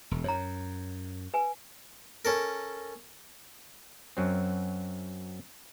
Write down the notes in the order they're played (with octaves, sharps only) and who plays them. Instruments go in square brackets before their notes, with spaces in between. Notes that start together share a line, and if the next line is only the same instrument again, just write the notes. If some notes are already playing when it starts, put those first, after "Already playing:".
[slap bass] E1
[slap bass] F#2 [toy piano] C#5 A#5
[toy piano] B4 G#5
[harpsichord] C#4 A4 A#4
[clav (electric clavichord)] F#2 F#3 C4